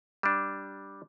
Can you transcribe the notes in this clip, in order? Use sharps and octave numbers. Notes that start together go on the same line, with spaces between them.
G3 D4